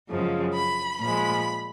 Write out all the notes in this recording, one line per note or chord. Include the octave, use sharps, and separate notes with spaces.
F#2 C#3 F3 G#3
B5
A#2 F3 G#3 B5